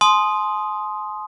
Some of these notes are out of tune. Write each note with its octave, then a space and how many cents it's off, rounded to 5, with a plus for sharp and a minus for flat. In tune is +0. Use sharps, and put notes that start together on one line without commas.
G#5 +45 C6 +0 D#6 +0